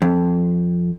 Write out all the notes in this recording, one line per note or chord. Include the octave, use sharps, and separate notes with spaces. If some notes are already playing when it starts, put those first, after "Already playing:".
F2